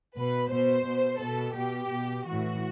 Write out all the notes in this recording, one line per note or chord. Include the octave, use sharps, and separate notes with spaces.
B2 B4
B2 C5
B2
B2 A4
B2 G4
B2
A2 E3 F#4